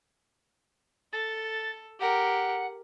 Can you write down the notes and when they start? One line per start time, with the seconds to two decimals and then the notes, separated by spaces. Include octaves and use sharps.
1.12 A4 A6
2.00 G4 A#4 F#5